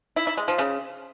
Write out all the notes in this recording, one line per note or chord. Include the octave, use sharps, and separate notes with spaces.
E4
E4
G#3
F3
C#3